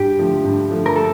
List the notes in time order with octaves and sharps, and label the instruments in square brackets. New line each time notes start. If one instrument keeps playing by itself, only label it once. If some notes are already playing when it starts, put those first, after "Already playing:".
Already playing: [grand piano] G2 [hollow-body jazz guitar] G4
[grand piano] D3 F3 A3
G2
D3 F3 A3
[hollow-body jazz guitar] A#4
A4